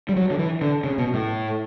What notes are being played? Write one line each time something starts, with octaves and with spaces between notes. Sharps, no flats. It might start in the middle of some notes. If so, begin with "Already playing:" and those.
G3
F#3
D3
E3
D3
C#3
B2
A2